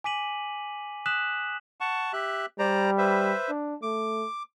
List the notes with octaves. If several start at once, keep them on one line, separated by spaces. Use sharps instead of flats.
G#5 D6 B6 D#7 F#7
D#6 F#6 B6 E7 F#7
F#5 A5 C#6
G4 E5 F#6
G3 C5 D5 A#5
B4 C5 E5
D4
A3 D6